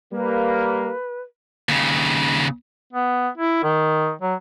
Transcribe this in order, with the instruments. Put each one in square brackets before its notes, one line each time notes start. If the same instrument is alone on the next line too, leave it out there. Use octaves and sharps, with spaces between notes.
[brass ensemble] G3 A#3 [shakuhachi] B4
[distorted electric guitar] D#2 C#3
[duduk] B3
E4
D#3
F#3